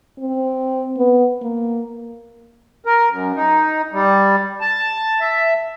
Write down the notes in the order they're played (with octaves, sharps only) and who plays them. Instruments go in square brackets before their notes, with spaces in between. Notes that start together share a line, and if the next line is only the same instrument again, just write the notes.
[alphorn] C4
B3
A#3
[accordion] A#4
F#2
D#4
G3
A5
E5